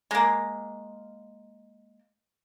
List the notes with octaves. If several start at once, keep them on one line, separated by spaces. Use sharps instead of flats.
G#3 A#3